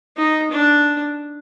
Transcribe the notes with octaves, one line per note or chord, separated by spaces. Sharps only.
D#4
D4